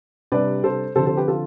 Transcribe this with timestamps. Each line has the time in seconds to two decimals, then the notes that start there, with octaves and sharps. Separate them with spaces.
0.32 C3 G3 D4 B4 D5
0.64 A4 C5
0.96 D3 F3 C4 A4 C5
1.07 A4 C5
1.17 G4 B4
1.28 F4 A4